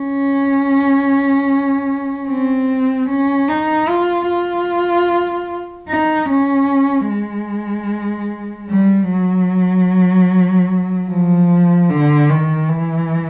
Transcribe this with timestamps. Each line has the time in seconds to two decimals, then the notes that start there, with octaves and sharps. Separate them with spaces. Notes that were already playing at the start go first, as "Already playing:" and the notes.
Already playing: C#4
2.28 C4
3.08 C#4
3.49 D#4
3.89 F4
4.28 F4
5.89 D#4
6.29 C#4
7.09 G#3
8.69 G3
9.10 F#3
11.09 F3
11.90 D3
12.30 D#3
12.69 E3